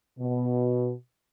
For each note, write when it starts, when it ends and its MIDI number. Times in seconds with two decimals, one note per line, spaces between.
0.19 0.93 47